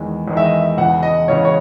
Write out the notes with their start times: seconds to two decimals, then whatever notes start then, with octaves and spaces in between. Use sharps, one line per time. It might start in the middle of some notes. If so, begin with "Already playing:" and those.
Already playing: E2 D#3 G#3
0.28 E2 D#3 G#3
0.37 E5
0.45 D#5
0.61 E5
0.77 E1 E2 C#3 E3 F#5
1.03 D#5
1.28 E1 E2 C#3 E3 C#5
1.45 C#5